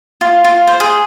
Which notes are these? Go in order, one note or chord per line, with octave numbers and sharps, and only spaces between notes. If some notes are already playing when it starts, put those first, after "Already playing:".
F4
F4
C5
G#4